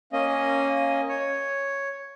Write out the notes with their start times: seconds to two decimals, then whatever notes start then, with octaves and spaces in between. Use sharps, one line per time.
0.13 A#3 C#4 D#5
1.09 C#5